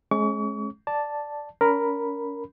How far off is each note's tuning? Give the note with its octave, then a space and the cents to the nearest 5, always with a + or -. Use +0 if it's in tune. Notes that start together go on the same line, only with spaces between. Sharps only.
G#3 +30 C#4 -30 C#6 +40
D5 +0 A5 +0
C#4 +35 A#4 +0 B5 +0